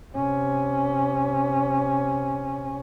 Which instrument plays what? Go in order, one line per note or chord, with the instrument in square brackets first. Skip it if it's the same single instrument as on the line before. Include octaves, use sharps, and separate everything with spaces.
[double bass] C3 C#4